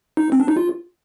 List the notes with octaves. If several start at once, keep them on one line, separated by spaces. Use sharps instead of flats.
D#4
C4
D4
D#4
F4